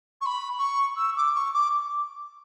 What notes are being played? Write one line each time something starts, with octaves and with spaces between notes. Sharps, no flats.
C#6
B5
C#6
E6
D6
C#6
D6